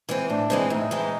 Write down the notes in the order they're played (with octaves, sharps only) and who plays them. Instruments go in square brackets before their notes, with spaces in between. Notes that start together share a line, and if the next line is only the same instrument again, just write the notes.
[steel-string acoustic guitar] E3 G#3 C4
[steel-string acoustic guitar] A2 [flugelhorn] D4
[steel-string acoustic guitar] E3 G#3 C4
[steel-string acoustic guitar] A2 [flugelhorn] D#4
[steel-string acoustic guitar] E3 G#3 C4